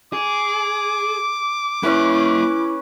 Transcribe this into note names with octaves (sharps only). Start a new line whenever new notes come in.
G#4 D6
A#3 C#4 E4 B4 E5